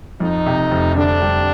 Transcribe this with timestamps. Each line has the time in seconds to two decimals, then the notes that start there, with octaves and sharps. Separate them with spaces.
0.20 F2 D#4
0.46 C3
0.71 F1
0.95 D3 D4
1.21 G3